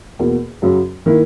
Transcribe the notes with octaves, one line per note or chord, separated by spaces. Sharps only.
E2 B2 A#3
F#2 C#3 F#3
D#3 A#3 E4